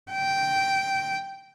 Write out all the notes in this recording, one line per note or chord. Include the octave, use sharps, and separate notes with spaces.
G5